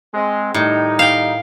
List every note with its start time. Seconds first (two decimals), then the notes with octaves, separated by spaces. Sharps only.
0.13 G#3 C4
0.54 A2 D#3 G3 D#4
0.99 F5 G5